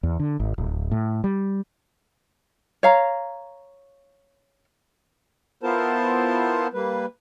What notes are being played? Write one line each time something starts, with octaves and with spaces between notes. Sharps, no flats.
E2
D3
G#1
D1
A2
G3
C#5 F5 A#5
B3 E4 F4 A#4 C5 A5
G3 A#3 B4